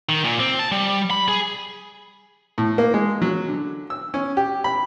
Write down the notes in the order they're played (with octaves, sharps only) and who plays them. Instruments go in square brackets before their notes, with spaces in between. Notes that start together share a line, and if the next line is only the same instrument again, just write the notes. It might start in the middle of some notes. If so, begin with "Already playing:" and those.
[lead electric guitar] D#3
A#2
C4
A5
G3
B5
G#4
[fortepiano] A2
A#3
G#3
F#3
D3
E6
C#4
G4
B5